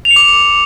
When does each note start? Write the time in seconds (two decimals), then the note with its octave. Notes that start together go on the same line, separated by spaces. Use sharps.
0.05 F7
0.11 C#7
0.16 D6